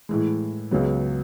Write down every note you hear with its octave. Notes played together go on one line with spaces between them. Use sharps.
A2 E3 G#3
C#2 C#3 F#3 B3